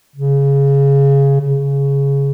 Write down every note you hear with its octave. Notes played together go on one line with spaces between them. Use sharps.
C#3
C#3